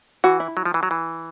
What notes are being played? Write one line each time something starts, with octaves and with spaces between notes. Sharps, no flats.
E3 F#4
E4
F#3
F3
E3
F#3
E3